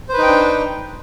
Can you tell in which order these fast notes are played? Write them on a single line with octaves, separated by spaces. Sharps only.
C5 B4 D#4 G5 D4